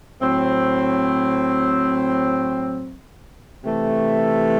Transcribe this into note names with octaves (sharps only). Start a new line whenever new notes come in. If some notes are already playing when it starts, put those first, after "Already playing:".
A2 F#3 C4
C3 E3 A3